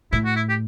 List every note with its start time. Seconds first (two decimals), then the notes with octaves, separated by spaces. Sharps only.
0.12 A2 E4
0.25 F#4
0.36 E4
0.49 G4